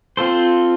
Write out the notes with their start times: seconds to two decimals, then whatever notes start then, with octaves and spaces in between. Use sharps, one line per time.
0.17 C4 F4 A4 C5